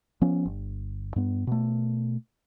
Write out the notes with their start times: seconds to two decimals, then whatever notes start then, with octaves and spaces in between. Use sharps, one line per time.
0.21 F3 B3 C#4
0.45 G1
1.16 G2 B3
1.47 B2 A3